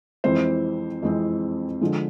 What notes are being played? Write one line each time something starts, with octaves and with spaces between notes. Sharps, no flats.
F2 E3 G#3 C4 C5
F2 E3 G#3 C4
D3 F3 G#3